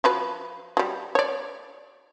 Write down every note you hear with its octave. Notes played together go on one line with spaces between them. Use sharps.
F3 F#3 B4
F#3 G3
C#5 D5